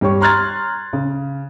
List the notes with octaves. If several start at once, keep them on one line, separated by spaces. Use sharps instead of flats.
G2 G4 C#5 C#6
A#5 C6 F6 F#6 G#6 A6
C#3